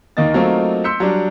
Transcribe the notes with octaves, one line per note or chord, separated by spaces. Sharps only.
D#2 D#3 A#3 D#4 D#5 A6
F#3 A3 A#3 C4 D#4 F4
C6 E6 G6 B6 C#7
F#3 G3 D4